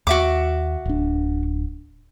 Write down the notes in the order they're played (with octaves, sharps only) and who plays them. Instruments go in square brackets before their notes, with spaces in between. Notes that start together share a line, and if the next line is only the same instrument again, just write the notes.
[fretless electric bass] D#2 [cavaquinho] F#4 E5 D6
[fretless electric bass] D1 D4